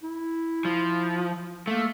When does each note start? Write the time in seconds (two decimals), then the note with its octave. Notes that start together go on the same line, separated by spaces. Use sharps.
0.03 E4
0.65 F3
1.67 A3 A#3